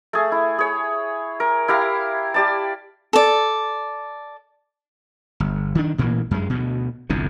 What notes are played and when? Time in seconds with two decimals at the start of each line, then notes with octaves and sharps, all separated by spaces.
0.13 A3 G#4
0.32 E4
0.59 G#4 C#5
1.40 A#4
1.68 E4 G4 F5 A#5
2.34 G4 D5 A5
3.13 A4 D5
5.40 G1
5.75 D#3 D4
5.98 A1 A#2 E3 A#3
6.31 F#2 G#3
6.50 D2 B2
7.10 G1 C2 F2 D3